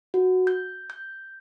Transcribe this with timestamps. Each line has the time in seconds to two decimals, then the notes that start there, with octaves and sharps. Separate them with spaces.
0.14 F#4
0.47 G6
0.90 G6